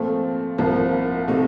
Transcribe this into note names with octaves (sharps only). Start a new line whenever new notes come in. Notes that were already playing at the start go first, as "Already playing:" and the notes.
Already playing: A#2 F3 A3 C4
C2 A#2 F3 A#3
C3 D#3 A3 D#4